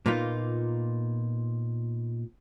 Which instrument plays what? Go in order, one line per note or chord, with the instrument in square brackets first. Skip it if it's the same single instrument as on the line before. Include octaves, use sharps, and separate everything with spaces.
[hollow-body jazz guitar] A#2 A#3 B3 D#4 F4